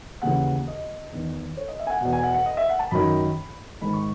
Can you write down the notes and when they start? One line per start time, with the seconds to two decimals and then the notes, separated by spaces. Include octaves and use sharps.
0.22 D#2 C#3 E3 F#5
0.67 D#5
1.12 E2 D#3
1.57 C#5
1.68 D#5
1.79 E5
1.87 G#5
1.90 F#5
2.01 B2 F#5
2.05 E2
2.13 G#5
2.23 F#5
2.34 F#5
2.46 D#5
2.57 E5
2.69 F#5
2.79 A5
2.91 F#2 D#3 B5
3.81 G#2 D#3 B5
3.93 C#6